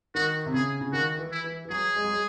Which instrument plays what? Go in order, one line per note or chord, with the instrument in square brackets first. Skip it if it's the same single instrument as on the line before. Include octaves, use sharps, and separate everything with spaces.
[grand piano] D#3 [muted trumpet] F#4
[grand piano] C3
[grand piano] C#3 [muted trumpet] G#4
[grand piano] C#3
[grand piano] D#3 [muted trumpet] F#4
[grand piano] E3
[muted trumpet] E4
[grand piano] E3
E3
[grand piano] F#3 [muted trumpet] G#4
[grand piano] G#3
F#3
G#3